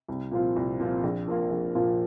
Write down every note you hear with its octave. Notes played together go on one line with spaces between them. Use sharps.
C2
A#2 F3 C4 F4
C2
A#2 F3 C4 F4
A#1
A#2 F3 A#3 F4
A#1
A#2 F3 A#3 F4